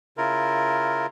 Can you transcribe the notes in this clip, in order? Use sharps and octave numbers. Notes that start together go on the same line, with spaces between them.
C#3 E4 F4 A#4